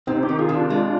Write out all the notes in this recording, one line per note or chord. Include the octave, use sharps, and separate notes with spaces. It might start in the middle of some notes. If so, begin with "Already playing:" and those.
C3 C4 D#4
D#4 G4
D#3
F4 G#4
C3
D4 F4
G#3